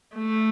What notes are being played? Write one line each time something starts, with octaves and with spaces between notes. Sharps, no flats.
A3